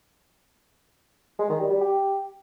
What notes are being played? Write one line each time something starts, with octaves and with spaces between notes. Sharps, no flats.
G#3
D#3
G3
G3
G4